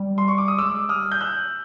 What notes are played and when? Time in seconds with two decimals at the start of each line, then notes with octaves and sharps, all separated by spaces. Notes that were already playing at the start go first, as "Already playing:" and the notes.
Already playing: G3
0.18 C6
0.28 C#6
0.38 D6
0.48 D#6
0.58 G#3 D6 E6
0.89 G3 D#6 F6
1.12 G6
1.21 E6 F#6